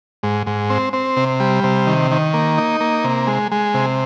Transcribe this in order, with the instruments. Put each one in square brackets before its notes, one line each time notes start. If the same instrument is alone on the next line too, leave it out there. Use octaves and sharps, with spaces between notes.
[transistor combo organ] G#2
G#2
C4
C4
C3
G3
C3
D#3
D#3
A#3
D#4
A#3
C3
G#3
G#3
C3